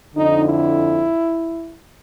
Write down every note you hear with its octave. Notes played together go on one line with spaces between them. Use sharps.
F2 D3 D#4
E4